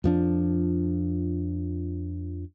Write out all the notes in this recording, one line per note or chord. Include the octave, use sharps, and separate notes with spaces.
F2 F3 D4